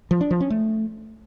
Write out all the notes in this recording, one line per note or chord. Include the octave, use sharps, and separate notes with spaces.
F3
D4
F3
C#4
A3